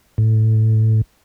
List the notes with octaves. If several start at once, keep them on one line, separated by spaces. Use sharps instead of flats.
A2